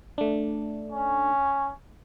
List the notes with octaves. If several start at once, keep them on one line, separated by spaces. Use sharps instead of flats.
A3 D4
C#4